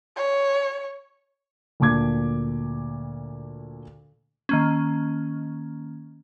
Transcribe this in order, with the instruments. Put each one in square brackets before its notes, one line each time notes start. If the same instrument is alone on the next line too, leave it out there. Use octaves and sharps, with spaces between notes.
[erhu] C#5
[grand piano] D2 A#2 A5 D6 G#6
[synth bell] D#3 A#3 C#4